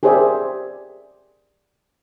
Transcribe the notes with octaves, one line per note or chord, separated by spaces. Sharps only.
G4 G#4 A#4 C5 D5 E5